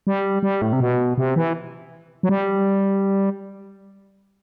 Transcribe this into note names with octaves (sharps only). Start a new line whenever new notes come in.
G3
G3
A2
C3
B2
C3
E3
F#3
G3